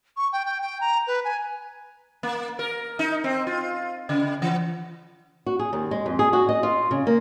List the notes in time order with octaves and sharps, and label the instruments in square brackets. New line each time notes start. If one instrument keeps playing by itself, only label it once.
[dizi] C#6
G5
G5
G5
A#5
B4
G#5
[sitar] A#3
A#4
D#4
C4
F4
C#3
E3
[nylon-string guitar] F#4
G#4
D#2
G#3
F2
G#4
F#4
D#5
F4
C#3
A#3